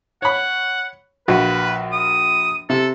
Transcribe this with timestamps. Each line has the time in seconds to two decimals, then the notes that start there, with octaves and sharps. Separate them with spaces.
0.22 C#5 F#5 B5
1.28 A#1 F4 F#4 B4
1.92 D#6
2.70 C3 A4